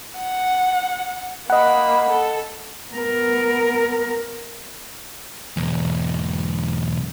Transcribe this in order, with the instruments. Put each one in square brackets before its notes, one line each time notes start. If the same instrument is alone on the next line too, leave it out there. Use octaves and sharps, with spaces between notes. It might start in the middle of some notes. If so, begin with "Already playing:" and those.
[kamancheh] F#5
[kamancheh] A#3 B5 [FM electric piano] D#5 F#5
[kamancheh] A4
[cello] B3 A#4
[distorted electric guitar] B1 E2